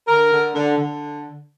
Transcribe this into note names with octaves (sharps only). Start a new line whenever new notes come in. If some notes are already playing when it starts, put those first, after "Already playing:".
D3 A#4
D3
D3
D3